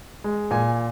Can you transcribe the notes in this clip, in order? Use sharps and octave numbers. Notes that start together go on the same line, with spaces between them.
G#3
A#2 G#5